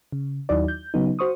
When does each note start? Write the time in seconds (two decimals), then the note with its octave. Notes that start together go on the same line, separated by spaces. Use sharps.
0.12 C#3
0.49 D#2 F#3 D#4 E4 F#4 D5
0.68 G6
0.94 C#3 F#3 B3 D#4
1.19 F#4 C5 C#6 D#6